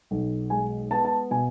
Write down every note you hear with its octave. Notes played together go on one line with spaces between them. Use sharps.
B1
G#3 G#5
B3 A5
A5
B2 G#5